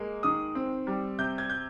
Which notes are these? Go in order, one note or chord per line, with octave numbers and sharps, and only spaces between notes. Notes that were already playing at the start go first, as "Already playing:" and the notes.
Already playing: G#3 A#3
D#3 D#6
C4
G3
C3 G6
G#6
G6